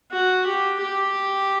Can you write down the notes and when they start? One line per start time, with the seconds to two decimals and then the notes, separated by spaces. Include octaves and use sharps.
0.11 F#4
0.47 G4
0.82 G4